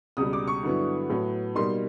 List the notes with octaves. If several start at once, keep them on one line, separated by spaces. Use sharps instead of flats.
C#2 B2 G3 D#6
D6
C#6
G2 D3 F#3 B3 E4
A2 F#3 B3
B2 G3 A#3 D#4 C6